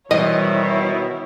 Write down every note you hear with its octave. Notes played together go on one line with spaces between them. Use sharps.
B2 D#3 E3 G3 C4 E4 C#5 D#5